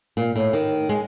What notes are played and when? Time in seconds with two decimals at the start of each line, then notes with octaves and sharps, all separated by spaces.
0.17 A#2
0.36 A2
0.53 D#3
0.89 G#3